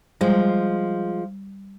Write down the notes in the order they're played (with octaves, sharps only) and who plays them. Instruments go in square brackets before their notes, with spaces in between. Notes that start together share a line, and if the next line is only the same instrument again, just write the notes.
[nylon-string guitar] F3 G#3 [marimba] G3